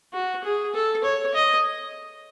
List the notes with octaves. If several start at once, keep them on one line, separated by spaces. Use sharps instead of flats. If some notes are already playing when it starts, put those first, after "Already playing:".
F#4
G#4
A4
C#5
D#5